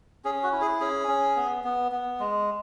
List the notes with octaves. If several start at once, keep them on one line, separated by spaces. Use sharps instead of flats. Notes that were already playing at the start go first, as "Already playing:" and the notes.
C#4 G#4
F#4
E4
G#4
C#4 G#4
C#4
B3
B3
B3
G#3